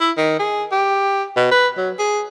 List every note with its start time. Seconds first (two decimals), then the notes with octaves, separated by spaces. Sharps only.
0.01 E4
0.17 D#3
0.39 G#4
0.72 G4
1.37 B2
1.51 B4
1.77 F#3
1.99 G#4